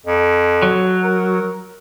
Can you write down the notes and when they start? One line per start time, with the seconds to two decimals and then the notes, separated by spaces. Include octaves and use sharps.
0.06 F2
0.62 F#3
1.04 A#4